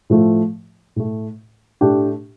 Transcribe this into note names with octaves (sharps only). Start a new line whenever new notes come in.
A2 F3 A3
A2 A3
A2 A3 D4 G4